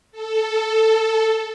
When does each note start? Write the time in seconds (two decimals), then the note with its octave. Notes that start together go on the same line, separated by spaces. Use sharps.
0.12 A4